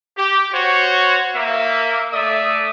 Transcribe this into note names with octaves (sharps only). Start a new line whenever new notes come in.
G4
F#4 C5 C#5
A#3 E5
A3 D5 E5 D#6